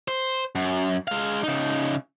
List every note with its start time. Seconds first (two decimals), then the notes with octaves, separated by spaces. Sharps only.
0.08 C5
0.55 F#2
1.08 G#3 F5
1.43 C#3 D#4